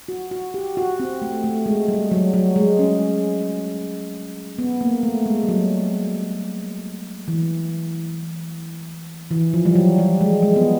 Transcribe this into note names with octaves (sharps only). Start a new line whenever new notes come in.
F#4
F#4
G4
F#4
C4
A3
A3
G#3
G3
F#3
F#3
G#3
C#4
B3
A#3
A3
G#3
G3
F#3
E3
E3
F3
G3
F#3
G3
G#3
G#3
B3